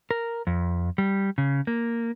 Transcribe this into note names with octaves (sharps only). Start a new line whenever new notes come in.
A#4
F2
G3
C#3
A#3